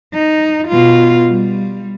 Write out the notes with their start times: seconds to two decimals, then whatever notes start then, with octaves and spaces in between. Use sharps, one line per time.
0.14 D#4
0.68 B2 F4
1.28 G3